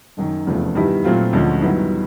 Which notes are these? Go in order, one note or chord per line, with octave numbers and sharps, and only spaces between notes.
F#1 F#2 D#3
F1 E2 C#3 F3 A3
G2 D#3 G3 B3 E4
A#2 F#3 A3 C4 F4
D2 D3 F3 G#3 C#4
G2 D#3 F#3 B3 E4